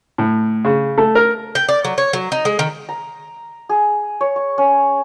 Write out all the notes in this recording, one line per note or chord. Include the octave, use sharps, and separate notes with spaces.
A2
C#3
A3
A#4
G5
D5
F#3
C#5
F#3
D#4
G#3
D#3
A#5
G#4
C#5
C#6
C#4